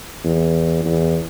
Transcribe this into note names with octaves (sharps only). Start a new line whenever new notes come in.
E2
E2